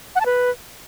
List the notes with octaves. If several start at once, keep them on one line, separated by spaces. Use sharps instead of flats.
F#5
A5
B4